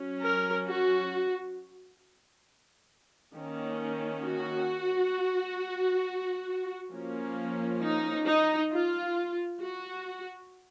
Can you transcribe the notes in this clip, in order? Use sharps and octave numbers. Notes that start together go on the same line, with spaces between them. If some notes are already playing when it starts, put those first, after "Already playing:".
Already playing: F#3 C#4
A#4
F#4
D#3 A#3 C#4
F#4
F3 A#3 C#4
D#4
D#4
F4
F#4